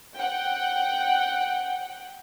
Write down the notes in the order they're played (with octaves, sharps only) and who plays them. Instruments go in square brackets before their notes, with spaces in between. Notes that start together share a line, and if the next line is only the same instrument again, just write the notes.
[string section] F#5 G5